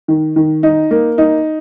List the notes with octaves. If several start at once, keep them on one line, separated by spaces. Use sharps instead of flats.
D#3
D#3
D#4
A#3
D#4